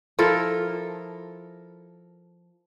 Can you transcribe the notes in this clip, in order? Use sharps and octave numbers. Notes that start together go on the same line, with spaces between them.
F3 E4 A4 A#4